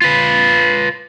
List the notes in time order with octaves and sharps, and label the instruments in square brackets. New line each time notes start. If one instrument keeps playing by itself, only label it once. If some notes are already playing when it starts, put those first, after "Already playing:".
[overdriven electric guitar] F4 B4